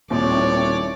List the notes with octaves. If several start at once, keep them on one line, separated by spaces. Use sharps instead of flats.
D#1 D#2 A2 C4 C#5 D5